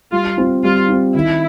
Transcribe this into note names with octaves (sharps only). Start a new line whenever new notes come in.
G3 F4
C4 F4
G3 F4
C4 F4
D#3 E4